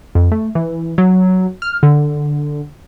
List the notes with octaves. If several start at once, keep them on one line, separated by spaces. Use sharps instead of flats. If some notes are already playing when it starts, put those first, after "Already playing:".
F2
A3
E3
F#3
F6
D3